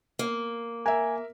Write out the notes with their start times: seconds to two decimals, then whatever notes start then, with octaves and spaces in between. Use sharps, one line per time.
0.19 A#3
0.86 A#4 E5 G#5